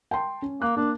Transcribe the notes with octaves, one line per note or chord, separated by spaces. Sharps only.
G5 A5 C6
C#4
A#3 F#6
A#3 D4